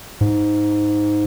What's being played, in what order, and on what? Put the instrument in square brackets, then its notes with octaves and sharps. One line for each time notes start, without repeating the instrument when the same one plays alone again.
[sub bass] G#2